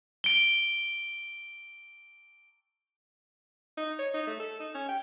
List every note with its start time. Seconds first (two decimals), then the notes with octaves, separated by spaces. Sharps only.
0.24 D7 G7
3.78 D#4
3.99 C#5
4.14 D#4
4.27 A3
4.40 A4
4.60 D#4
4.75 C#4
4.89 G5